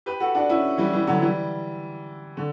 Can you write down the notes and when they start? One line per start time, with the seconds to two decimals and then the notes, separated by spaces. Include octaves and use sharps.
0.06 G4 B4
0.20 F#4 A4
0.35 D4 F#4
0.49 C#4 E4
0.78 E3 G3
0.93 E3 G3
1.07 D3 F#3
1.21 E3 G3
2.37 D3